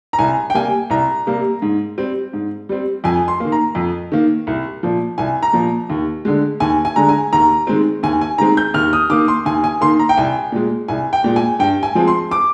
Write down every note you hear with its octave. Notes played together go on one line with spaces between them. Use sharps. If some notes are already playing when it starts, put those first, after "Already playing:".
A#5
C2 G#5
G5
C3 G3 A#3 G#5
C2 A#5
C3 G3 A#3
G#2
G3 C4
G#2
G3 C4
F2 G#5
C6
D#3 A#3
A#5
F2
D#3 A#3
C2
A#2 F3
C2 G#5
A#5
A#2 F3
D#2
D3 G#3
D#2 G#5
G#5
D3 G#3 A#5
G#5
D#2 A#5
D#3 G#3 C4
D#2 G#5
G#5
D#3 G#3 C4 A#5
G6
D#2 F6
D#6
D#3 A#3 D6
C6
D#2 G#5
G#5
D#3 A#3 C6
A#5
G5
C2 G#5
A#2 G#3
C2 G#5
G5
A#2 G#3
G#5
G2 G5
G#5
F3 G#3 C4
C6
D6